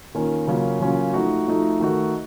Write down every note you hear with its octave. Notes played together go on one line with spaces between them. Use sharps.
D#3 A#3 C#4 F4
C#3 F#3 A#3 C#4 F4
C#3 F#3 A#3 C#4 F4
F3 A3 D#4 F#4
F3 A3 D#4 F#4
D#3 A3 D#4 F#4